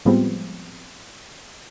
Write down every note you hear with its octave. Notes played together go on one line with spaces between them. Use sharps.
A2 F3 G3 G#3 B3 C4